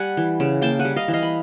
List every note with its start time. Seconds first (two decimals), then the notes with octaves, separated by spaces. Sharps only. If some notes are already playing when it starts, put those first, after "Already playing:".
Already playing: G3 F#5 G#5
0.17 E3
0.40 C#3
0.62 A#3 G5 A5
0.79 F#5 G#5
0.85 G3
0.96 D#5 F5
1.08 E3
1.13 D#5 F5
1.23 B5